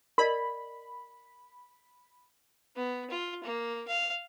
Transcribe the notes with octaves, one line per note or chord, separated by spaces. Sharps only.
A#4 D5 D#5 B5
B3
F4
A#3
F5